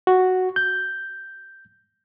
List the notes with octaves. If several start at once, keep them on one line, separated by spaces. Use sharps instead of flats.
F#4
G6